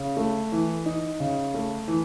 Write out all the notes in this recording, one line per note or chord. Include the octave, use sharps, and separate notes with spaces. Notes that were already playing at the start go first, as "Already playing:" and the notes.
Already playing: C#3
A3
E3
D#4
C#3
A3
E3